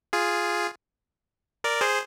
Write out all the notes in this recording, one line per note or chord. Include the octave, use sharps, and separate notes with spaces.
F4 G#4
A#4 D5
G#4 C5